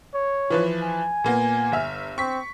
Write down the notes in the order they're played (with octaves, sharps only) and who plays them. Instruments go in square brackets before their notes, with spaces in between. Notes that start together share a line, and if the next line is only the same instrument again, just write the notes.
[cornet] C#5
[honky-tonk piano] E3 F3 B4
[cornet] G#5
[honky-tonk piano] A#2 A#3 B3
G1 E5 F6
[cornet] C4 [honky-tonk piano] C#6 B6